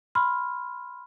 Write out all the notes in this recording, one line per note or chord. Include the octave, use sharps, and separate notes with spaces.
B5 C6 F6